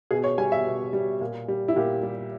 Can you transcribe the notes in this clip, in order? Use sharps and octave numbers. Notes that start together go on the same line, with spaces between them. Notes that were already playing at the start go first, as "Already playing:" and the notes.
B2 G#4
C#5
G3 G#5
E5
B2
G3
A#2
G3
E4
A#2 G4
G3